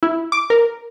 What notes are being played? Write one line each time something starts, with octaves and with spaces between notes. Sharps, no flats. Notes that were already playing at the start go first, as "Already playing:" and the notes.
E4
D6
A#4